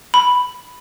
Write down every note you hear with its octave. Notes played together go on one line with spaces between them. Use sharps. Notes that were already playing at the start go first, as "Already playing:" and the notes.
B5